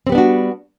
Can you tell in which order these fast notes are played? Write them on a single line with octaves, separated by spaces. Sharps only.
C4 G3 B3 D4 F#4